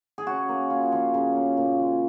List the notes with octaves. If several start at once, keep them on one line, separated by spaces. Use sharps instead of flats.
G#4
C#3 F#4
A#3
F4
F3
C#3
A#3
A#2
G#3